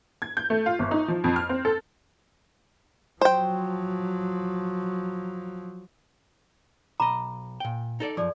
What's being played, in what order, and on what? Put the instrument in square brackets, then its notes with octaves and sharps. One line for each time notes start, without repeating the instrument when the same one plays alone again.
[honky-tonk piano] G#6
G6
A3
F4
G1
D#4
F3
F2
F6
C4
A4
[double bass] F3 F#3 [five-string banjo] C5 G5
[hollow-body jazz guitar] B1 D#5 [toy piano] A#5 B5 D6
[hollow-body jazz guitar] A#2 G5
D#4 A4 D5
[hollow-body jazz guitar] F#2 A2 F3 [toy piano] G#4 A4 D5